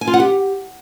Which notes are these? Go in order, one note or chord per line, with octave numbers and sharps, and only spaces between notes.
G#5
F4
F#5
G4